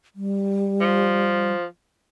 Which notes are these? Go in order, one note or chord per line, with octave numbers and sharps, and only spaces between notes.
G3
F3